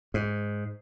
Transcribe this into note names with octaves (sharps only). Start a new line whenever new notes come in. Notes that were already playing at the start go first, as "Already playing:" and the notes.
G#2